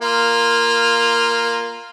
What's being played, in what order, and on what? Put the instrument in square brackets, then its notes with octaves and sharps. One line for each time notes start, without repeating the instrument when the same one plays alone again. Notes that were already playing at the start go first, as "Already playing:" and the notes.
[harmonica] A#3 F4